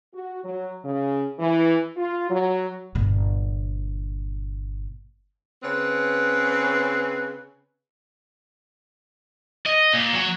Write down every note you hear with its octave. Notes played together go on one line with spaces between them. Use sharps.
F#4
F#3
C#3
E3
F4
F#3
G1 A#2
C#3 C4 B4
D#5
A#2
F#3